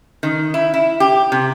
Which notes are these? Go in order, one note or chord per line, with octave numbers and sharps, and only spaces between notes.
D#3
E4
E4
G4
C3